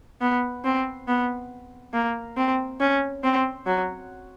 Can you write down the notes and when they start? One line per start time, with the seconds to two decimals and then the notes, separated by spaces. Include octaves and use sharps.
0.21 B3
0.64 C4
1.08 B3
1.94 A#3
2.37 C4
2.80 C#4
3.24 C4
3.66 F#3